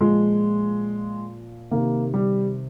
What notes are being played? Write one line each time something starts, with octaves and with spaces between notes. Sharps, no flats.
A#2 F3 G#3
C3 D#3 A#3
G3